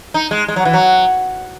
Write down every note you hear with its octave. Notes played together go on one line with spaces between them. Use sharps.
D#4
G#3
G#3
F#3
E3
F#3